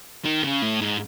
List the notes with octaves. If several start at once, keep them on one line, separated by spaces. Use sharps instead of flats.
D#3
C#3
A2
G#2